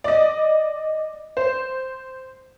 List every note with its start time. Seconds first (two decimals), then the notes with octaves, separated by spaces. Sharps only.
0.04 D5 D#5
1.37 C5